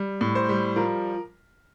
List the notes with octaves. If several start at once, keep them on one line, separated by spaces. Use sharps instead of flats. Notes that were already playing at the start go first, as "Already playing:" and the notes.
Already playing: G3
A2
C5
G3
F3 A#4